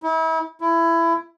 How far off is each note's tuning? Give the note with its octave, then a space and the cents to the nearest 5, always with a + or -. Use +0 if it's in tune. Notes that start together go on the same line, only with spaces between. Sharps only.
E4 -35
E4 +20